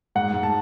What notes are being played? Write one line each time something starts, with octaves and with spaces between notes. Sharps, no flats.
G#2 F#5
G#2
A5